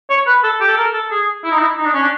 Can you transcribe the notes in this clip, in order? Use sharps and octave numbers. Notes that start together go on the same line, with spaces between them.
C#5
B4
A4
G4
A4
A#4
A4
G#4
E4
D#4
E4
D#4
D4
C#4
D4